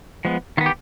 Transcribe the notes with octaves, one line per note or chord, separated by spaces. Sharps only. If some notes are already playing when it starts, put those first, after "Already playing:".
F3 G#3 B3
D#3 B3 F4
G4